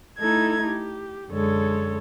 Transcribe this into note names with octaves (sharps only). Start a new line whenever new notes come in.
A3 D#4 E4 A4 G#6
G4
F#2 D3 G#3 A4 C#5